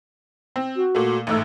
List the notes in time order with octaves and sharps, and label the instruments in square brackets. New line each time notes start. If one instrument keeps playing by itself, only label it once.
[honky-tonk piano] C4
[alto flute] F#4
[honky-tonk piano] A#2 A3
[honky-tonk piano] A1 G#2 E6 [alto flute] A3